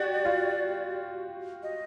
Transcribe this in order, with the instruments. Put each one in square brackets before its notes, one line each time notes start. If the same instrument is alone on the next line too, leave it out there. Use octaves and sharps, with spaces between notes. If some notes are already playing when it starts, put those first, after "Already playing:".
Already playing: [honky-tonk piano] F#4 G4 [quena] D5
[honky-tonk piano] F4
[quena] D#5